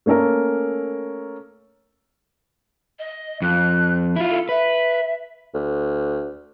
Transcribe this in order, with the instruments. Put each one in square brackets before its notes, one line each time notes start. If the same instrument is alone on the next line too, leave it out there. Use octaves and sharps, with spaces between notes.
[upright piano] A3 A#3 C#4 A4 A#4
[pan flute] D#5
[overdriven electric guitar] F2 [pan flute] F#6
[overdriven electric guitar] E4 F4
[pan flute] A4
[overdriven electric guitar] B4 [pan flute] E5
[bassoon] D2